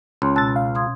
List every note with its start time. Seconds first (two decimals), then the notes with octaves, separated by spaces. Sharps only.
0.22 C#2 C#4 C#5 C6
0.36 B2 A5 E6 F#6 A6
0.56 F5
0.75 C6 D#6 G#6